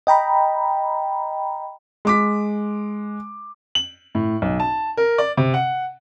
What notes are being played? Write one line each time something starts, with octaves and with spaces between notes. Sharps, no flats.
D#5 G5 A#5 B5
G#3 D6 B6
F#7
A2
B1
A5
A#4
D5
C3
F#5